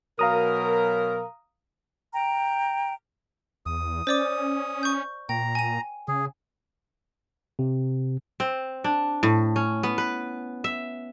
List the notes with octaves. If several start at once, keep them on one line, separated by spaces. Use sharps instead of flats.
B2 F#3 A#4 F5 A#5 D#6
G5 A#5
E2 D#6
C#4 C5 D5 D6
C#6 G6
A#2 G5 A#5
G#5 D#7
C#3 G#4
C3
C4
D4
A2
C#4
B3
B4
E5